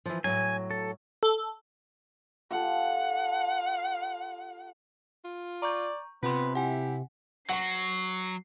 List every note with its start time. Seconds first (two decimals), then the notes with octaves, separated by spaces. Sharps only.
0.06 E3 F3
0.24 A2 F#3 G#5
0.71 A4
1.23 A4
2.51 F4 G4 A4 F#5
5.25 F4
5.62 D5 A#5 C#6 G6
6.23 C3 B3 F4 B4 C6
6.55 E4 G4 F#5 G#5
7.49 F#3 F#5 C#6 C7